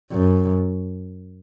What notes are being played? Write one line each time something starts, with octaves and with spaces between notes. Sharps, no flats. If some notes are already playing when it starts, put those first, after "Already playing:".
F#2